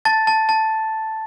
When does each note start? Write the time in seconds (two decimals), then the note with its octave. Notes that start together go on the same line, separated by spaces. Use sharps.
0.05 A5 A6
0.27 A5
0.49 A5